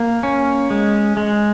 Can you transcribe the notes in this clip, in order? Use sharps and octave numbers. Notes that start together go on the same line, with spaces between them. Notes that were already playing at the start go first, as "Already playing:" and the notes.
Already playing: A#3
C#4
G#3
G#3